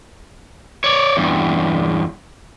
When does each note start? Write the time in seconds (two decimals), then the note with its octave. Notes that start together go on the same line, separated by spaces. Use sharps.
0.84 C#5 D5
1.17 E2 G2